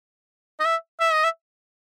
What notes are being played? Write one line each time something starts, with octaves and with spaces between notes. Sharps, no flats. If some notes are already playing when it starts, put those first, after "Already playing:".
D#5
E5
E5
D#5
E5